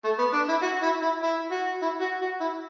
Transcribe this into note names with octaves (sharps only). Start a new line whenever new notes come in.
A3
B3
D4
E4
F#4
E4
E4
E4
F#4
E4
F#4
F#4
E4